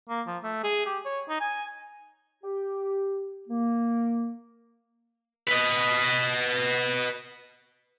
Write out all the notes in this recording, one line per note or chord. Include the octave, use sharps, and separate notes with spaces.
A#3
F3
A3
G#4
G4
C#5
D#4
G#5
G4
A#3
B4 D#5